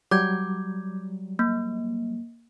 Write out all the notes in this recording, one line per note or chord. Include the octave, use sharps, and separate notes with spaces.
F#3 G3 D6 G6 G#6
A#3